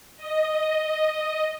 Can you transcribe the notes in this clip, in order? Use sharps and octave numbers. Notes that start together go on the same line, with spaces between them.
D#5